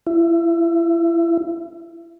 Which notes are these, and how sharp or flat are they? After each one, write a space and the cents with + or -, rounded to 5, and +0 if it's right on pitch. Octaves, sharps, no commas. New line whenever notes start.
E4 +30